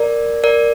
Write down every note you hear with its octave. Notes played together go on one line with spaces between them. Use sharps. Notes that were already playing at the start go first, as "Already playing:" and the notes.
Already playing: A#4 D5
A#4 D5